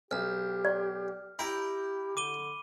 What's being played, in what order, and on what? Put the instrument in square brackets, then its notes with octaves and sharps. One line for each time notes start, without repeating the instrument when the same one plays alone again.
[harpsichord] B1 [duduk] G4 [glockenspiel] F6
[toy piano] D5
[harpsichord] E4 G5 A#5 [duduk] G4 [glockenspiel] B5
[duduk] D3 [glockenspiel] D6 D#7 G7